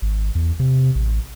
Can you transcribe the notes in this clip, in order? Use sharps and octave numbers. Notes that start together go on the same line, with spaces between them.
G#1
E2
C3
A1